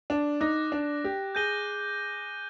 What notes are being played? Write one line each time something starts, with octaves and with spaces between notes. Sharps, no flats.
D4
D#4 D6 F#6 A#6
D4
G4
G#4 G6 A#6 D#7 G7